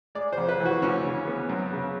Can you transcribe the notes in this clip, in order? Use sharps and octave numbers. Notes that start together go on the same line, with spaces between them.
G#3 D5
C5
F2
B4
E3
F#4
D2 C#4
C#3
B3
F#2
C#3